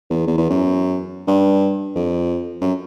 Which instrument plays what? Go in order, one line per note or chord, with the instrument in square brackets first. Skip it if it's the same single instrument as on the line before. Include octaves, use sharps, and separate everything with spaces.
[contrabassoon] E2
E2
E2
F#2
G2
F2
F#2